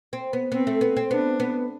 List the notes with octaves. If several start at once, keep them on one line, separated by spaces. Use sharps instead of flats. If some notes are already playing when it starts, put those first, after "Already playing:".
C4
B3
B3 C4
A3
B3
C4
B3 D4
B3